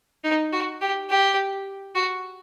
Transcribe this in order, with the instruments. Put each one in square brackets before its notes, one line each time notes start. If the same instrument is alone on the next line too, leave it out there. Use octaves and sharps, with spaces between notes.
[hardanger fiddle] D#4
F#4
G4
G4
F#4